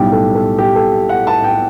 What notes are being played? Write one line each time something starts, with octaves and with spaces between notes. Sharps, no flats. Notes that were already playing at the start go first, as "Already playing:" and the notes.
Already playing: B1 A2 G3 G4
A4
A4
G4
A4
F#5
A5
G5